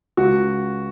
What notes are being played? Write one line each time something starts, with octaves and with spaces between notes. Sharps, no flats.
C#2 F#4